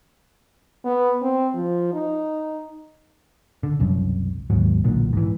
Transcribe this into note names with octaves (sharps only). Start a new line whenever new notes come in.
B3
C4
F3
D#4
D3
E1 C2 F#2
D#2 G#2 F#3
B1 E2 A#2 D3
G#2 E3